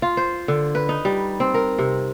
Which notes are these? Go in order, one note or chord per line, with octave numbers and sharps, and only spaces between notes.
F4
C5
D3
B4
D#4
G3
C4
A#4
C3